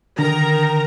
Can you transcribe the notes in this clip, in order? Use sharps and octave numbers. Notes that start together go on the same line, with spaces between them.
D3 D#3 A#4 A#5